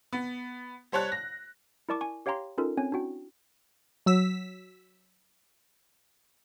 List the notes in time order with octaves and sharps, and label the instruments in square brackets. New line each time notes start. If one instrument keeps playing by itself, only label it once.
[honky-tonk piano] B3
G3 C5 C#5 A5 F#6
A#6
[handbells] E4 A#4 D5 A5 C#6 D6
G#5 C#6
G4 C#5 F5 G5 A#5 C6
C#4 D#4 F4 A4 A#4
C4 C#4 C#5 G#5
D4 E4 F#4 G5
[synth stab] F#3 E6 B6